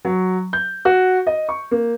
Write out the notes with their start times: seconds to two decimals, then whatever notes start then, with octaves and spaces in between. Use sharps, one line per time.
0.05 F#3
0.53 G6
0.85 F#4
1.27 D#5
1.49 C#6
1.71 A#3